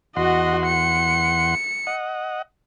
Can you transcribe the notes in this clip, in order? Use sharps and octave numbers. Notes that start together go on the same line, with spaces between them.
E2 F#4 D#5 F#5 C6
C#7
D#5 F#5